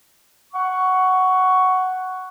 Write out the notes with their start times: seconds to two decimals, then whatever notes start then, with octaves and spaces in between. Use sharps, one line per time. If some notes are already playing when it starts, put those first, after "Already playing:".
0.54 F#5 C#6